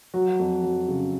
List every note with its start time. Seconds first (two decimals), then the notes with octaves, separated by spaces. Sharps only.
0.14 F#3 F#4
0.39 F2
0.63 F#3
0.88 C#3